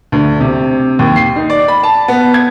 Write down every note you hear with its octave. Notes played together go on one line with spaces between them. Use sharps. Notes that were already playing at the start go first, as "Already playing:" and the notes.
D2
C3
D#2
C7
D#4
D5
B5
A5
B3
G#6